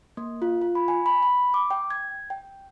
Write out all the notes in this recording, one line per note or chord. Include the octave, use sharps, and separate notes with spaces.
A#3
F4
F4
B5
G#5
B5
B5
D6
G5
G#6
G5